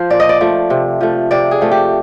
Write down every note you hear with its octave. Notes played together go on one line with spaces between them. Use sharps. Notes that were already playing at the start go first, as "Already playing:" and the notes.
Already playing: F3 C5
A#2 D5
D#5
D5
F3 A3
C3
F3 A3
C3 D5
G#4
F3 A3
G4